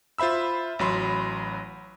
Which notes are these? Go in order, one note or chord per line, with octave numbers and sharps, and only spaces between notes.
F4 C5 E5 B5 E6
A1 F#3 B5 C6